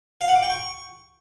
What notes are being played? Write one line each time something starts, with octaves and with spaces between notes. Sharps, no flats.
F5
F#5
D6
G5
C#6